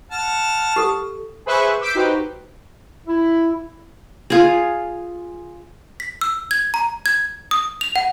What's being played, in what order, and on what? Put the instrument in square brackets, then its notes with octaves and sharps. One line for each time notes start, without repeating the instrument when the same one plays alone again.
[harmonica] F#5 A5 F6
[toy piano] G4 A4
[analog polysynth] G#4 B4 C5 E5 C#6 F#6
D6 E6 G6 B6 C7 D7
D#4 F#4 G4 B4 C5
[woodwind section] E4
[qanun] F4 G#4
[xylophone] B6
E6
G#6
A#5
G#6
D#6
F7
F#5